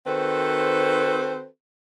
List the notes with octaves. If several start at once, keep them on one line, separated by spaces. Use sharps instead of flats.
D#3 C4 F#4 A4 B4 C5